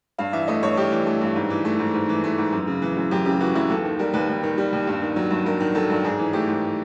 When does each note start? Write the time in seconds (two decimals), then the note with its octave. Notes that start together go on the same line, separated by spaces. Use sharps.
0.18 G2 F5
0.33 E3 E5
0.48 A3 D#5
0.63 G2 C#5
0.77 G2 G4
0.92 E3
1.07 A3
1.21 G2
1.36 G#2
1.50 E3
1.65 A3
1.79 G#2
1.94 G#2
2.09 E3
2.24 A3
2.38 G#2
2.53 F#2
2.67 C#3
2.82 E3
2.97 F#2
3.11 F#2 G4
3.26 C#3 G4
3.40 E3 F#4
3.55 F#2 E4
3.70 D#2 A4
3.85 D#3
3.99 G3 A#4
4.14 D#2 B4
4.28 D#2
4.43 D#3
4.58 G3
4.73 D#2
4.87 G2
5.02 D#3
5.16 F#3
5.31 G2
5.46 G2 A#4
5.60 D#3
5.75 F#3 A4
5.90 G2
6.04 G#2 G#4
6.19 E3
6.33 A3 G4
6.48 G#2